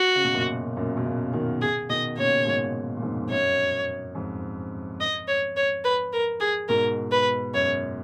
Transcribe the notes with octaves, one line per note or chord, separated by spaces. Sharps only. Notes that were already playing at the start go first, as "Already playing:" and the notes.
Already playing: F#4
C#3
B2
F#2 A#2
F#2 A#2
B2
A#2 C#3
B2 D#3
G#4
B2 D#3 D#5
A#2 C#3 C#5
G#2 B2
A#2
F2 G#2
F#2 C#5
F2 G#2
D#5
C#5
C#5
B4
A#4
G#4
G#2 B2 A#4
B4
F#2 C#5